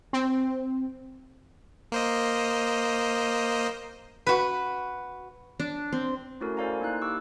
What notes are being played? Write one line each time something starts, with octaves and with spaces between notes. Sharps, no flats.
C4
A#3 C5 D#5
F#4 B4
D4
C4
A3 C#4 E4 F#4 A4 A#4
A4 C5 D5 F5 G#5 A#5
A#3 D#4 E4 F#6
G4 C#6 D6 E6 F#6